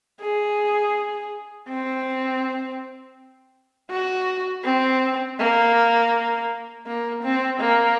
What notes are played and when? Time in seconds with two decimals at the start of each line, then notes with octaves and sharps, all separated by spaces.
0.20 G#4
1.68 C4
3.90 F#4
4.64 C4
5.38 A#3
6.86 A#3
7.23 C4
7.60 A#3